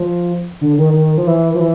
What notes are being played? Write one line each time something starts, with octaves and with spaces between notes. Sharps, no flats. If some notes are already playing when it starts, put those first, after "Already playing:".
Already playing: F3
D3
D#3
D#3
F3
E3
F3
E3